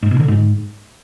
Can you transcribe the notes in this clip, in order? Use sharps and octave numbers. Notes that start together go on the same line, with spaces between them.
G#2
B2
D3
G#2